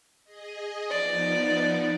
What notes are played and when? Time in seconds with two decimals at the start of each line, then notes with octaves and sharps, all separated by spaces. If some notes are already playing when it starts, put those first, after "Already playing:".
0.24 G#4 D#5
0.90 F3 B3 D#4 D5